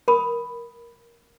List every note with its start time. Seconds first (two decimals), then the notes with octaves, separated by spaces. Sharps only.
0.08 A#4 B5 D#6